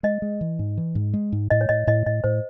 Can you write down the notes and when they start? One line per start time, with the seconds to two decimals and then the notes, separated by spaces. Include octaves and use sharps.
0.03 G#3 D#5
0.22 G#3
0.41 E3
0.59 G#2
0.78 E3
0.95 G#2
1.14 G#3
1.32 G#2
1.50 A2 D#5
1.61 C#5
1.69 A2 D#5
1.87 A2 D#5
2.06 A2 D#5
2.24 A2 C5